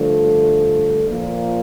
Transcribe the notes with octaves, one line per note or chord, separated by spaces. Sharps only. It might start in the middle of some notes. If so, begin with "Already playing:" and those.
Already playing: G2 D3 F3 A3
A#2 F3 A#3